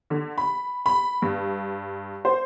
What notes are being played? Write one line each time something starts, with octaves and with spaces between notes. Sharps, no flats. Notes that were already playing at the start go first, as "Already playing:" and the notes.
D3
B5
B5
G2
C5